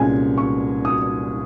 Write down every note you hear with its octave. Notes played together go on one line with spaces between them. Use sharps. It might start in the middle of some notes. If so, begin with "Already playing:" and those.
Already playing: C2 A#2 G#3 C#4 G#5
C#6
D#6